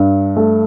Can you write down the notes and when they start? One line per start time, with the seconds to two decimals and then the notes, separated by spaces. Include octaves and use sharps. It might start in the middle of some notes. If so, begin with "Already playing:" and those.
Already playing: G2
0.37 A3